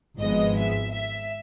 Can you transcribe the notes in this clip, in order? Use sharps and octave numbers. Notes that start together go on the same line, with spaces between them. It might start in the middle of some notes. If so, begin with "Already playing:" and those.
G#1 G#2 F3 G#3 B3 D#5
E5
E5